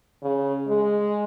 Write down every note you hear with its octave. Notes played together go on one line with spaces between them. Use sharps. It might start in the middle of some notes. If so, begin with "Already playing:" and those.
C#3
G#3